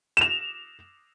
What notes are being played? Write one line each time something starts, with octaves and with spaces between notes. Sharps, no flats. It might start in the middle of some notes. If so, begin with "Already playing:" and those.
E7 F7